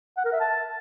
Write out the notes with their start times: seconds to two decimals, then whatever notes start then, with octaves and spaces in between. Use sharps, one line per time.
0.17 F#5
0.25 A#4
0.32 E5
0.40 A5